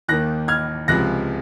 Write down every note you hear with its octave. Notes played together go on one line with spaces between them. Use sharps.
D#2 D#3 A#3 F#6 A#6
F6 G#6
C#2 C3 F3 G#3 F#6 A#6